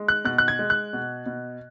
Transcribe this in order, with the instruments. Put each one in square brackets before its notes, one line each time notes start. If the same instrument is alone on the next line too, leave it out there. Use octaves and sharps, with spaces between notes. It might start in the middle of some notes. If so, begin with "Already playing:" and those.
Already playing: [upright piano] G#3
F#6
B2 F#6
F#6
G#6
G#3
F#6
B2
B2